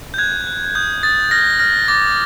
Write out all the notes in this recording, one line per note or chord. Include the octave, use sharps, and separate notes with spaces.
G6
F#6 G#6
F#6
D#6 G6
D#6 A6
F6 A#6
F6 A#6
D6 A6